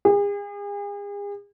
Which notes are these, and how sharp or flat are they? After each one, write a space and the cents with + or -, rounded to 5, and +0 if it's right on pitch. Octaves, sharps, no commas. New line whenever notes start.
G#4 -40